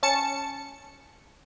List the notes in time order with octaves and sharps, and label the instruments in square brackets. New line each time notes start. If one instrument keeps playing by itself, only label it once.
[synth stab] C#4 A5 C#7